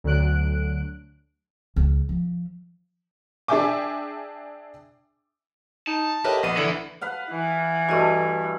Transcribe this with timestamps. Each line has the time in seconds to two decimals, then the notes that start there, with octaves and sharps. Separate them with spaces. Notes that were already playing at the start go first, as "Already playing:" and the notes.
0.04 D2 D3 F#3 F#6 D7
1.76 C#2
2.09 F3
3.48 D4 G#4 E5 G5 G#5 D6
5.87 D#4 A5
6.24 A2 G4 A#4 B4 D#5
6.43 A#1 B3 D#7
6.57 A#1 D3 E3 E4 C#7
7.01 B4 F5 F#5
7.31 E3
7.89 G2 A3 F#4 D#5 D6